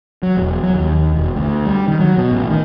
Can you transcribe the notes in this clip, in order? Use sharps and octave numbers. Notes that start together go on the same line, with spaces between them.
F#3
E1
F#3
D#2
E1
D2
G3
D#3
F#3
B2
A1
D#3